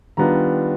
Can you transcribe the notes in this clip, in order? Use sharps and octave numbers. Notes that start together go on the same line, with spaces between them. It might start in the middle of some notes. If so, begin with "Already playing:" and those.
D#3 G3 B3 D4 F4 A#5